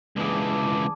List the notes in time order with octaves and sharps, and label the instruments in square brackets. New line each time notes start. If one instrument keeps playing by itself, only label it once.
[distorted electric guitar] C#2 E3 [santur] D4 G#4
[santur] D6